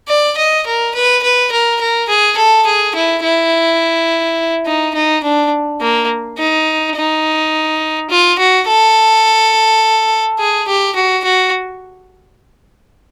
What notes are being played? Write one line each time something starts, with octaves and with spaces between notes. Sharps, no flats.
D5
D#5
A#4
B4
B4
A#4
A#4
G#4
A4
G#4
E4
E4
D#4
D#4
D4
A#3
D#4
D#4
F4
F#4
A4
G#4
G4
F#4
F#4